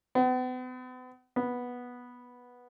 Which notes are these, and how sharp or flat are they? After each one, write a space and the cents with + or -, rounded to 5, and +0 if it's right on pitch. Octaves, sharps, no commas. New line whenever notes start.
B3 +40
B3 -10